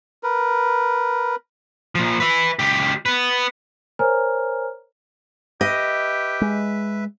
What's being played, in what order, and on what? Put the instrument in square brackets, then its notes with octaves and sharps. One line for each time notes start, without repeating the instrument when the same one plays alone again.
[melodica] A#4 B4
[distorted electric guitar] A#2 F3
B4 E5
C#2 G4
B3 B4
[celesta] A#4 C5 C#5 G#5 A#5 F6
[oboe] G4 [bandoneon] B4 E5 [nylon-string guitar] D#5
[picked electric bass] G#3